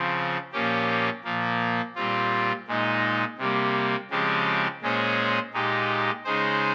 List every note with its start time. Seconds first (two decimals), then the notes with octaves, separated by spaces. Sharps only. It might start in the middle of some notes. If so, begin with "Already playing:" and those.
Already playing: C#3 F3 C4
0.52 A#2 F3 A#3 C#4 G4
1.24 A#2 F3 A#3
1.95 A#2 G3 C4 F4
2.67 A#2 G#3 D#4
3.38 C3 G3 A#3
4.10 C#3 F3 G#3 C4 G4
4.82 A#2 G#3 C#4 G#4 C5
5.53 A#2 G#3 D#4 G4
6.24 C#3 G#3 D#4 G#4 C5